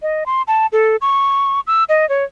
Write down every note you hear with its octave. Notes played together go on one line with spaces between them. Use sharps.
D#5
C6
A5
A4
C#6
E6
D#5
C#5